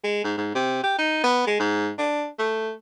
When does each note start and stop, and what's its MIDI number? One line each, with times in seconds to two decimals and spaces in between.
0.04 0.24 56
0.24 0.35 44
0.37 0.51 44
0.55 0.80 48
0.83 0.96 67
0.98 1.22 63
1.23 1.47 59
1.47 1.59 56
1.60 1.90 44
1.98 2.27 62
2.39 2.72 57